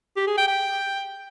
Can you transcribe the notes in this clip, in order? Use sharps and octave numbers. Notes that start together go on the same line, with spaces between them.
G4
G#4
G5
G5